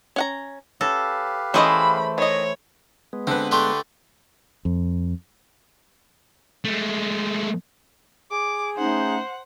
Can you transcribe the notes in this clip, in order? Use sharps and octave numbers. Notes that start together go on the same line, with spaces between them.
C#4 F#5 A#5
C#4 G4 A4 B4 F5
E3 A3 C#4 G#4 C5 D#5 B5
D#3 C#5 D#5
G#3 B3
D3 C4 B4
A3 D4 G4 C6
F2
G#3 A3
G#4 D6
A3 C#4 D#4 C5 F#5